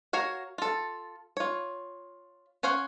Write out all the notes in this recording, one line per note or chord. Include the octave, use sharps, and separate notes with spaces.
F#4 A#4 C#5 F5
F4 A4
F4 C#5
C#4 C5 C#5 F5 F#5